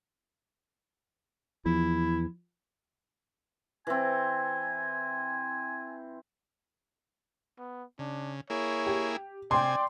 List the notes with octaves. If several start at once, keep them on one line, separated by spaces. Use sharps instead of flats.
E2 F3 E4
E3 C4 G#5
B3
C#3 D4
A#3 E4 G#4 C#5
G4
C3 D5 G5 G#5 C6